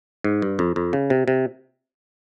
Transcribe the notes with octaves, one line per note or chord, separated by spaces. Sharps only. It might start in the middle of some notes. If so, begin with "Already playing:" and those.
G#2
G2
F2
F2
C#3
C3
C3